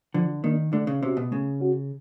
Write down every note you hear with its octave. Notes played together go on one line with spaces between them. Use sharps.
D3 F3
D#3 A#3 D4
D3 A3
C#3
C3 C#4 F#4
B2
C#3 A3
C#4 F#4